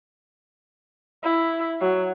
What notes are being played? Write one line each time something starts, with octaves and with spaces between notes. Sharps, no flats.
E4
F#3